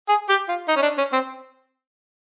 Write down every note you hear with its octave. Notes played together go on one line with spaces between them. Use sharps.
G#4
G4
F4
D#4
C#4
D4
C#4
C4